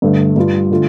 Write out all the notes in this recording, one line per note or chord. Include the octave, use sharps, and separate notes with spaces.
G2 D3 A3
G2 G3 F4
D3 A3 F4